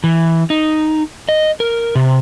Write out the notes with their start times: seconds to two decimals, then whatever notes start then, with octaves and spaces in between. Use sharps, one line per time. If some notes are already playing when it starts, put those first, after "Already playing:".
0.04 E3
0.50 D#4
1.29 D#5
1.60 A#4
1.95 C3